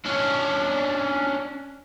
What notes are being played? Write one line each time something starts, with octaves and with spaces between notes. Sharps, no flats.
C#4 D4